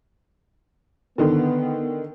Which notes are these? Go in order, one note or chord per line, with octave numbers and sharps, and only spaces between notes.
D3 D#3 B3